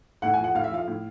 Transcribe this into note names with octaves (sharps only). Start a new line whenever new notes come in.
A2 F#5
G#5
F3 F#5
A2 F5
E5
F3 F5
A2